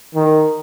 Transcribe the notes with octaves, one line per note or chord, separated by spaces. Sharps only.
D#3